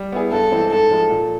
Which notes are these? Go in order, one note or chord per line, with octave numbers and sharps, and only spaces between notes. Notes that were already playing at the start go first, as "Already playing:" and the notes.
Already playing: G3
B3 E4 G#4
G2 A4
E3 G#3 C4
G#2 A4
F3 G#3
A#2